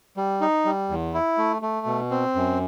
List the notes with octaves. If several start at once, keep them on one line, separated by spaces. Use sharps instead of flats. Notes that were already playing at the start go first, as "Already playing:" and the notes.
G3
D#4
G3
E2
E4
A3
A3
B2
C4
F#2